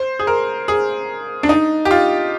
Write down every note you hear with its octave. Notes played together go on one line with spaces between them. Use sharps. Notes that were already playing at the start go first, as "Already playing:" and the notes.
Already playing: C5
G#4
A#4
G#4
D4
D#4
G4
F4